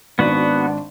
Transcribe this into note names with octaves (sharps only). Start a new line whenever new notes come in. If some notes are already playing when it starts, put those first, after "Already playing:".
G#1 D#3 B3 D4 F#4 D5